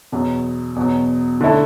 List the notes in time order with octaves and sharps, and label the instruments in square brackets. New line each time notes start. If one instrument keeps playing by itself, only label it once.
[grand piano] E2 B2 F#3
E2 B2 F#3
D3 A3 E4 A4